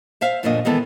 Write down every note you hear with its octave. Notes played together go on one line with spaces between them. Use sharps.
C5 E5 F5
F#2 A#2 D3 F3 A#3 D#5
D#3 E3 G#3 B3 A4